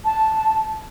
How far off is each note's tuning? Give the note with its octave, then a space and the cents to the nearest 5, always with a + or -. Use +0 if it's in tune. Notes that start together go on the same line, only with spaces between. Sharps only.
A5 -5